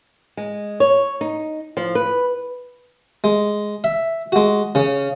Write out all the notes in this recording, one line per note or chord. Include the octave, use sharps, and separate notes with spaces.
G#3
C#5
D#4
F3
B4
G#3
E5
G#3 F#4
C#3 C#4